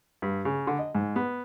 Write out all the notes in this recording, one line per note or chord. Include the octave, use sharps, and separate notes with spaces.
G2
C#3
D3
D#5
G#2
B3